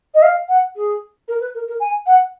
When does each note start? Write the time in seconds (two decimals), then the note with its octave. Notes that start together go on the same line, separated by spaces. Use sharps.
0.14 D#5
0.22 F5
0.48 F#5
0.75 G#4
1.28 A#4
1.40 B4
1.54 A#4
1.67 A#4
1.80 G#5
2.06 F#5